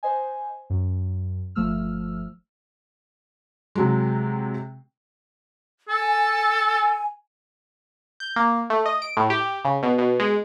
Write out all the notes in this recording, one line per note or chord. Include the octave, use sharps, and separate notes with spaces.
C5 D#5 G#5
F#2
G1 F3 A3 E6 F6
C3 F#3 G#3
A4 G#5
G6
A#3
A3
D#5
D7
A2
G4
C#3
B2
B2
G#3